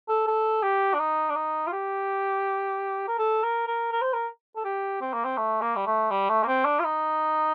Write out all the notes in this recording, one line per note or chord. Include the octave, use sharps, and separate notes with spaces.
A4
A4
G4
D4
D#4
D4
D#4
F4
G4
A#4
A4
A#4
A#4
A#4
C5
A#4
A4
G4
C4
A#3
C4
A3
A#3
G3
A3
G3
A3
A#3
C4
D4
F4
D#4